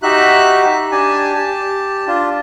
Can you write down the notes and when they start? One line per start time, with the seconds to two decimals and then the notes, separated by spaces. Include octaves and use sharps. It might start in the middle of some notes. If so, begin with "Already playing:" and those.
0.03 D#4 F#4 G4 E5 F#6
0.92 D4 G4 G#5 A5
1.34 G4 A5
2.07 D4 F4